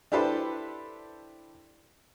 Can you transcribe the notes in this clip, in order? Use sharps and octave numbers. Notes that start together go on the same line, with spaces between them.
D4 E4 G4 A4 B4 C5